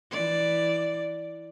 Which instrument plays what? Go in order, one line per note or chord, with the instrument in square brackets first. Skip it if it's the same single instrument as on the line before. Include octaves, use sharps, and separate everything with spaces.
[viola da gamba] E3 D5